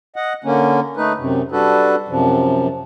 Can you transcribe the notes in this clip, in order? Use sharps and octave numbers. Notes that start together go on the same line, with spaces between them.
D#5 F#5
D3 A#3 C#4
A3 D#4 B4
F#2 C3
G3 D4 F#4 A4 B4
F#2 C3 F3